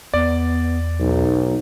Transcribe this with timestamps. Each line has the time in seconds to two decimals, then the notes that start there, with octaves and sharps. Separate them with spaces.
0.14 E2 B3 D5
1.00 B1 D#4